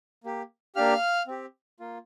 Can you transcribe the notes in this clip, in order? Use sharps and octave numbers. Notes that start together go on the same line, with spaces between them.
A#3 G4
A#3 D4 G4 F5 F6
C4 G4
A#3 F4